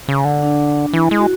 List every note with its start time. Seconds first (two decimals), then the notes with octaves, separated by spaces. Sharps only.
0.08 C#3
0.25 D3
0.42 D4
0.93 E3 E4
1.11 G#3
1.19 F#4